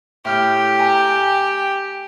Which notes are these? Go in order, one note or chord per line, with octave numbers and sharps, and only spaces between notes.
A2 G4 F6 G6
G5 G#5 A#5